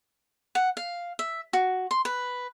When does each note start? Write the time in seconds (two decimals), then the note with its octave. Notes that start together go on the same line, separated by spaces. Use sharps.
0.55 F#5
0.77 F5
1.19 E5
1.53 F#4
1.91 C6
2.05 B4